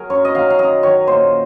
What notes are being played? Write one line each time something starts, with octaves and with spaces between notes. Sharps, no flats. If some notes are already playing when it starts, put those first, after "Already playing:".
Already playing: F#3 G#4 A#4
F#2 C#5
D#5
D#3 F#3 F5
F5
F#2 D#5
D#3 F#3 C#5
A#2 C5